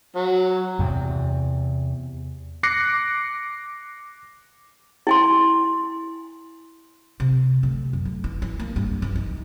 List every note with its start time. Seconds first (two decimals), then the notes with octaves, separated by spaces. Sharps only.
0.16 F#3
0.79 E2 C3
2.63 D6 F#6 A#6 C7 C#7
5.07 E4 G#5 C6
7.20 C3
7.63 D2
7.93 F#2
8.05 D2
8.24 E3
8.42 E3
8.59 A#3
8.76 G2
9.02 E3
9.16 D#4